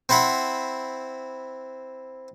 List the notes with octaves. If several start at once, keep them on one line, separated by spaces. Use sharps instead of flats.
C4 E4 C5 F#5 B5